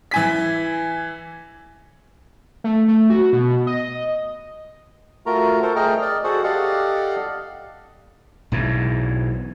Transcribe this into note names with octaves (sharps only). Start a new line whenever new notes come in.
E3 G#5 B6
A3
A3
F#4
B2
D#5
A3 F4 F#4 A#4 A#5
A4 A#4 C5
A3 G#4 D#5 G5 A#5 F6
D5 D#5
F#4 G#4 A4 C5 F#5
G4 A4 D5 D#5 F5 F#5
B1 G#2 E3